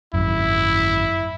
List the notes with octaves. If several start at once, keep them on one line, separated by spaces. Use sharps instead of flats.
G#1 F#2 E4